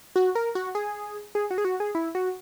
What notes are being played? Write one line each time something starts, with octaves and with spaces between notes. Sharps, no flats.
F#4
A#4
F#4
G#4
G#4
F#4
G#4
F#4
G#4
E4
F#4